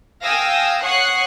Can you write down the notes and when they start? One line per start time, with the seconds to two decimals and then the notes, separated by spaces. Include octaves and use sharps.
0.24 F5 G5 G#5 D#6 E6 A#6
0.84 C#5 F#5 C#6 D#6 F#6 C7